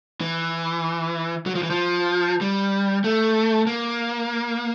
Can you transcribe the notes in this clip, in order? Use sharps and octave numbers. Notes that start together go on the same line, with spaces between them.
E3
F#3
F3
E3
F3
G3
A3
A#3